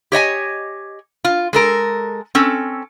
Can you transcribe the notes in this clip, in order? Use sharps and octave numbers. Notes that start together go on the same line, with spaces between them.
G4 C#5 D#5 G#5
F4
G#3 A4 A#4
C4 C#4 A4